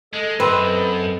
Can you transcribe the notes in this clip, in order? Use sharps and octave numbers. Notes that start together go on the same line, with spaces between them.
G#3 A4 D#5
F#2 C4 B4